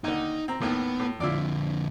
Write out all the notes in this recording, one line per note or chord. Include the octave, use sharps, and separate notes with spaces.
D#2 D3 D#4
C4 A#5
D#2 A2 B3
A2
F2 D3 E4 F4 D5